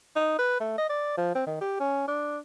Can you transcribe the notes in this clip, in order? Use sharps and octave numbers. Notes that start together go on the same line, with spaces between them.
D#4
B4
A3
D#5
D5
F3
C4
D#3
G4
C#4
D4